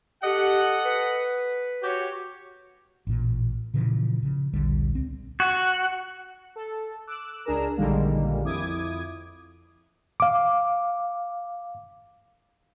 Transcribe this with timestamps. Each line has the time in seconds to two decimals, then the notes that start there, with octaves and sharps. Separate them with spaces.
0.24 G4 A4 D#5 F#5
0.85 B4
1.83 F#4 G4 C#5
3.07 A1 A#2
3.74 A#2 C#3 E3 F3
4.23 C#3 F3
4.53 A#1 D#2 D3 G3
4.95 C#2 C4
5.40 F#4
6.56 A4
7.07 D6 E6 F#6
7.44 C#2 D4 G#4 A#4 A#5 E7
7.77 A#1 D3 D#3 G3 G#3 A#3
8.44 F2 E4 D6 D#6 G#6
10.20 F5 D6